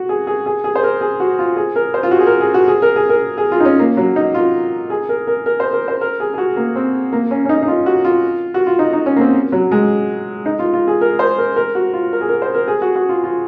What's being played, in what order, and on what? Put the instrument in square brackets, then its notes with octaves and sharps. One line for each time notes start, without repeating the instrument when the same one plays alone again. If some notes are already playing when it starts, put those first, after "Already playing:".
Already playing: [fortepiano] F#4
G#4
G#4
G#4
G#4
C5
A#4
G#4
F#4
F4
G#4
A#4
C5
F4
F#4
G#4
A#4
G#4
F#4
G#4
A#4
G#4
A#4
G#4
F4
D#4
C#4
A#3
F#3
D#4
F4
G#4
A#4
A#4
A#4
C5
A#4
C5
A#4
G#4
G#4
F#4
A#3
C4
A#3
C#4
C#4
D#4
D#4
F4
F#4
F4
F#4
F4
D#4
D#4
C#4
A#3
C4
F#3
G#3
D#4
F4
F4
G#4
A#4
C5
A#4
A#4
F#4
F4
A#4
G#4
A#4
C5
A#4
G#4
F#4
F#4
F4
F4